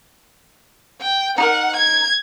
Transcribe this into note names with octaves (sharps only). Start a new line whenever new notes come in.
G5
D#4 G4 A#4 F#5
G#6